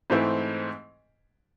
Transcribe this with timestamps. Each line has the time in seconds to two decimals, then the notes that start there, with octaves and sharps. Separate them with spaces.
0.10 G#2 E3 A3 C4 E4